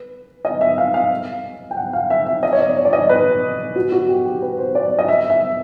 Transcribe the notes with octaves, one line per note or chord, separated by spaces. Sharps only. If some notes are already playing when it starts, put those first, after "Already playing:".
Already playing: B4
D#5
E5
F5
F5
G5
F#5
F5
E5
E5
D#5
C#5
D5
C#5
D5
D#5
B4
F#4
F#4
G4
G4
B4
C5
D5
D#5
E5
E5